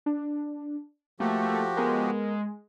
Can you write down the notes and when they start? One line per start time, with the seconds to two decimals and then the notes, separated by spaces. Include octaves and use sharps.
0.06 D4
1.20 F3 A3 A#3 F#4 G4
1.77 G#3 B3 A#4